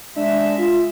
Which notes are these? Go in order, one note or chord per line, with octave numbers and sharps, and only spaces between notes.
G#3 D4 E5
F4